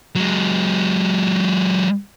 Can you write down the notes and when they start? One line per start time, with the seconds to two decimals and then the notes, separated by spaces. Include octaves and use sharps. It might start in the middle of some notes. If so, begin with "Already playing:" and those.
0.16 F#3 G#3